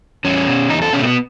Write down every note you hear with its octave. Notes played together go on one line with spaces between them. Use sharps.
E2 C#4
B2
E2 D#4
A4
B2 C#4
A3
B3